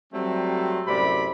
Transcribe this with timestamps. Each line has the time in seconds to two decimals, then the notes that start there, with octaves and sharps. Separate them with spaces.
0.13 F#3 G3 A3 C4
0.87 F#2 A2 C3 D5 B5